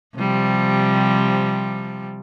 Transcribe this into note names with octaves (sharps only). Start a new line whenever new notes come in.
C3 F3 G3